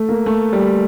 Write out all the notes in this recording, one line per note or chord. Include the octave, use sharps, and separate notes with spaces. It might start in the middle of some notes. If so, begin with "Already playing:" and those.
Already playing: A3
A#3
A3
G3